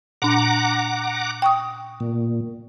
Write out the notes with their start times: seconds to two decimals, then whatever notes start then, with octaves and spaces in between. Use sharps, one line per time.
0.22 A#2 D4 F#5 A#5 D6
1.42 G5 C#6 D#6
2.00 A#2